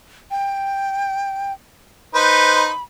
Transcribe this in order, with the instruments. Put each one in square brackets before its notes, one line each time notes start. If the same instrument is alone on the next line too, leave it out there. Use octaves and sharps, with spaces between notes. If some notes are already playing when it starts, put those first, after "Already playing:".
[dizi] G5
[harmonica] D#4 B4 C5 [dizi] B5